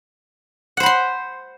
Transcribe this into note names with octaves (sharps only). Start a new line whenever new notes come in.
C5 F#5 B5 C6